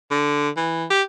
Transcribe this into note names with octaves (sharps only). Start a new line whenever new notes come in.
D3
E3
G4